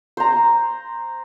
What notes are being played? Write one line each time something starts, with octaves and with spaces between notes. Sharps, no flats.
C5 A#5